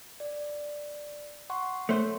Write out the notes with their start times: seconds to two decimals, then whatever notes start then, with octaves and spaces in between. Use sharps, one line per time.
0.20 D5
1.50 F#5 C6 C#6
1.89 A3 C5 C#5